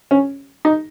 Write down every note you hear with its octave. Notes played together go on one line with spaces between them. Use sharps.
C#4
D#4